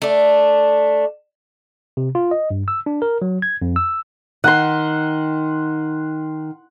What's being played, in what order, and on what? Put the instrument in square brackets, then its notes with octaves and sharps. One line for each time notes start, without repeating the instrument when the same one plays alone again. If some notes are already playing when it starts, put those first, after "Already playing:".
[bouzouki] A3 D4
[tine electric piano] C3
F4
D#5
G2
E6
D4
A#4
F#3
G#6
F2
E6
[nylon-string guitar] D#3 [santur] F#5 C6